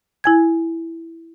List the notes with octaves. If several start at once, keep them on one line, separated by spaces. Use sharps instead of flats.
E4 G#5 G#6